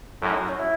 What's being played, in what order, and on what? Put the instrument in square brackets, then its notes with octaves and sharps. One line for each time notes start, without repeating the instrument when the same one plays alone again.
[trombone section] F#2 A2 [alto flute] C#4
[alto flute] D#4
F#4
C#4
E4